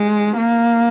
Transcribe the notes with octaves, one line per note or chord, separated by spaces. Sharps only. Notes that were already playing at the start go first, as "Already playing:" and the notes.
Already playing: G#3
A#3